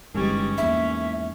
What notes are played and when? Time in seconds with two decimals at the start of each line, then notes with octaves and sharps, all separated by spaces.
0.14 G1 G#2 E3 G3 G#3 C#4
0.58 E2 G#2 A#3 E5